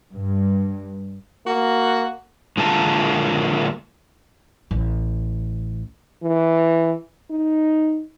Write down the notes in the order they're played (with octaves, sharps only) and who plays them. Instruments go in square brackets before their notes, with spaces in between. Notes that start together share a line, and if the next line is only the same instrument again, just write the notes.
[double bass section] G2
[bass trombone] A#3 [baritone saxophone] F#4
[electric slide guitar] D3 G#3 A#3 F4 A#4 A5
[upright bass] A1
[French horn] E3
D#4